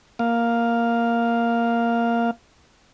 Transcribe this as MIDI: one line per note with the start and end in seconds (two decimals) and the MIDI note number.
0.19 2.31 58
0.19 2.31 77